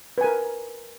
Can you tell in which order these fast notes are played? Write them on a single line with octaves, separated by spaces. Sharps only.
B4 G#5 A#4